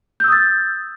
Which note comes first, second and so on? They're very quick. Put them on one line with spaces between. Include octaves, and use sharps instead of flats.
G6 E6 D#6 A6